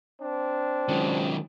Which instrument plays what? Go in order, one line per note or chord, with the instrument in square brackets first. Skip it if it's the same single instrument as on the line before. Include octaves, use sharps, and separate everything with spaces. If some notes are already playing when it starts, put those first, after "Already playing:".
[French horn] C4 [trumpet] D4
[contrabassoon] C#2 [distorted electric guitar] D#3 F#3